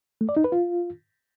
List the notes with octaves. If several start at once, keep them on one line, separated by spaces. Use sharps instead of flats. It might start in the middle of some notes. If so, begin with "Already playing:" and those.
A3
D5
D#4
B4
F4